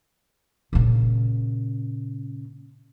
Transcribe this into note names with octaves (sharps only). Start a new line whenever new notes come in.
A#2 C#3